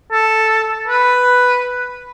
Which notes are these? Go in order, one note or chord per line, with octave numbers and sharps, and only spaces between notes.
A4
B4